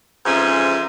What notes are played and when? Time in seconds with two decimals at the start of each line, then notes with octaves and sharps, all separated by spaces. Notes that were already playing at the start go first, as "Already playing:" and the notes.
0.25 F2 G#2 E3 C#4 G#4